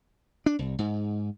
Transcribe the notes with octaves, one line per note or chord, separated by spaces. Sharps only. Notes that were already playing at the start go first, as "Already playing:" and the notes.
D4
C2
G#2